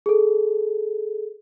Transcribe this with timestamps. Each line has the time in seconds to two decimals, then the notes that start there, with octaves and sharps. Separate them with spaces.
0.06 G#4 A4